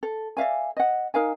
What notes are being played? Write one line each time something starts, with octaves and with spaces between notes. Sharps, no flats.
A4
D5 E5 F5 G#5
D#5 F#5
D#4 A#4 F5 G#5